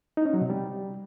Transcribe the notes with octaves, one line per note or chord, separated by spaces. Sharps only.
D#4
C#4
F#3
C3
G3